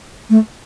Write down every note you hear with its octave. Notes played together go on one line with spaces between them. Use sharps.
A3